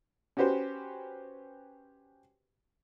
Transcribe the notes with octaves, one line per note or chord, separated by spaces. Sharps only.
C#4 F#4 G4 B4 C5